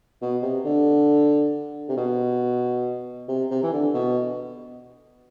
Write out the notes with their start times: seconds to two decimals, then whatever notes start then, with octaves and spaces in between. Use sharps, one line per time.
0.22 B2
0.43 C3
0.64 D3
1.89 C3
1.97 B2
3.29 C3
3.51 C3
3.63 E3
3.73 D3
3.95 B2